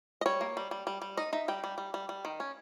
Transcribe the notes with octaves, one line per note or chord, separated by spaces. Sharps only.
D#5
G3 C#5
A#3
G3
G3
G3
G3
D#4 D#5
D#4 E5
G3 G5
G3
G3
G3
G3
D#3
C#4